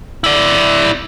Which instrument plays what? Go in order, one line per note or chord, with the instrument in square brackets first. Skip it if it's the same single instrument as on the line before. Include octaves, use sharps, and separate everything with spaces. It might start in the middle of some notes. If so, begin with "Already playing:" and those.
[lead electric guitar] E4 D5